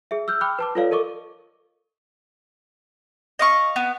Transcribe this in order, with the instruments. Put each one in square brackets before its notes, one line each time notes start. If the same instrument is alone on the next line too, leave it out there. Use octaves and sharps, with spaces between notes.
[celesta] G#4 E5
E6 F6 G6
G5 B5 D6 F6 F#6
B4 A5 D6
F4 A4 B4 C#5 D5 F5
A4 A#4 D#5 C#6 D6
[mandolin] D#5 F5 C#6
B3